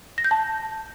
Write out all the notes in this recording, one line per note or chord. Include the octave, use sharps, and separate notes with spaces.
A#6
G6
A5